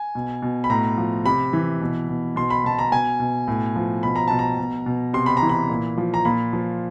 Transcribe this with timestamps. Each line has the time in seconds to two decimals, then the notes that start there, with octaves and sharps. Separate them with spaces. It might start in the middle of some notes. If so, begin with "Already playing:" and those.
Already playing: G#5
0.15 B2
0.42 B2
0.64 B5
0.70 A2 A#5
0.98 F3
1.25 C3 B5
1.53 E3
1.81 B2
2.09 B2
2.36 B2 C6
2.50 B5
2.64 B2 A5
2.79 A#5
2.92 B2 G#5
3.20 B2
3.48 A2
3.76 F3
4.03 B2 B5
4.16 A#5
4.28 B2 A5
4.39 A#5
4.59 B2
4.86 B2
5.13 C3 C6
5.26 B5
5.37 A#5
5.42 E3
5.49 B5
5.70 A#2
5.97 F3
6.14 A#5
6.25 A#2 B5
6.53 F3